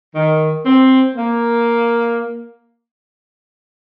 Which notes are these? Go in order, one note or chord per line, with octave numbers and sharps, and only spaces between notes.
D#3
C4
A#3